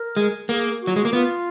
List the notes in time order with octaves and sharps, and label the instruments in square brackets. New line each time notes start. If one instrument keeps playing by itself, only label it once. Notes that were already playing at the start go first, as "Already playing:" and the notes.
Already playing: [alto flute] A#4
[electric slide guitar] G#3
[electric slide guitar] A#3 [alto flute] G#4
[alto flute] F#4
[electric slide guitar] F#3
G#3
A#3
[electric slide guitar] B3 [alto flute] F4